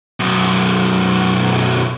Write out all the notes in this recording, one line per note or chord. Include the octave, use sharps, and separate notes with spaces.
B1 F#2